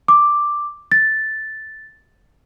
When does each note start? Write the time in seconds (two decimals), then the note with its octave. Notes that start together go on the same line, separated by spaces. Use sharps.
0.08 D6
0.92 A6